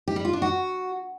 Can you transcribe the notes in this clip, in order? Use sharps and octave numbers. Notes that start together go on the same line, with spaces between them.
G4
G3
F4
D4
F#4